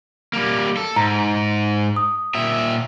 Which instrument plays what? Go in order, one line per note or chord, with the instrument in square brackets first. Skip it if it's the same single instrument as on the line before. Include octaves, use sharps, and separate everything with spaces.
[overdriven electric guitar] G3 A#3
A4
[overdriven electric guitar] G#2 [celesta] A#5
[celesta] D#6
[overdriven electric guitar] A#2 E5